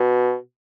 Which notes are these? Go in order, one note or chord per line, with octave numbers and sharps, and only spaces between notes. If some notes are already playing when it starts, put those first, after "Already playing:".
Already playing: B2